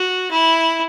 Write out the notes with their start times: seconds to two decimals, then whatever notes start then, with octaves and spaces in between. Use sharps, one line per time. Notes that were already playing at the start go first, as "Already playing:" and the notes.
Already playing: F#4
0.31 E4